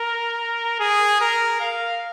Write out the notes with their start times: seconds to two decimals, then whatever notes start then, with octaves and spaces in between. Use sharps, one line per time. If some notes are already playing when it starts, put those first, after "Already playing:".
Already playing: A#4
0.80 G#4
1.21 A#4
1.61 F5